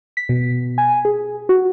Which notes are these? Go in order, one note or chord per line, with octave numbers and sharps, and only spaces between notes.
B6
B2
G#5
G#4
F#4